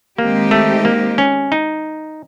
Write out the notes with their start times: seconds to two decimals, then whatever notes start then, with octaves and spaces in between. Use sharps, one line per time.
0.18 D#3 G#3 A#3 C4 D#4 G4
0.51 A3
0.85 A#3
1.18 C#4
1.52 D#4